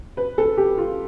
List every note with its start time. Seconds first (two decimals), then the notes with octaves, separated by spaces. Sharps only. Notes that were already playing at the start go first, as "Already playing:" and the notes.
0.17 B4
0.38 A4
0.57 G4
0.78 F4